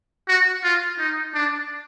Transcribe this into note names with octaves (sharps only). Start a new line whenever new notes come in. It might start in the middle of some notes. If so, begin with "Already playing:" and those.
F#4
F4
D#4
D4